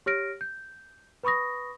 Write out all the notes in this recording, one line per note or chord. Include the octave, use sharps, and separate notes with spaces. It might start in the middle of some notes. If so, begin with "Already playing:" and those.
G4 C#5 F6 A#6 D7
G6
B4 B5 C#6 D#6 A#6